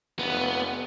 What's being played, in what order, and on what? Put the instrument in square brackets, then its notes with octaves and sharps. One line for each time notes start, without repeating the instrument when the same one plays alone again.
[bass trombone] F1 [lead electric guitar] B3